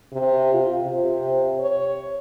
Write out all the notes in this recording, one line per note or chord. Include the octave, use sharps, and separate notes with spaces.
C3
F4
C3
C#5